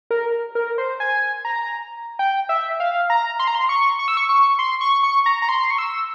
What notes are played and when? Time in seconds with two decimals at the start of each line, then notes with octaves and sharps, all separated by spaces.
0.11 A#4
0.55 A#4
0.78 C5
1.00 G#5
1.45 A#5
2.19 G5
2.49 E5
2.80 F5
3.10 A#5
3.39 C6
3.47 A#5
3.55 C6
3.69 C#6
3.99 C#6
4.08 E6
4.17 C#6
4.29 C#6
4.59 C6
4.81 C#6
5.03 C#6
5.26 A#5
5.42 A#5
5.49 C6
5.71 C#6
5.78 E6